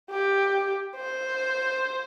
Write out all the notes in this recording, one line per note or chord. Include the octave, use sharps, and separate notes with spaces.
G4
C5